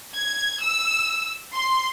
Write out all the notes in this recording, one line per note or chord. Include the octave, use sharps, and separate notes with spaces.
G#6
E6
C6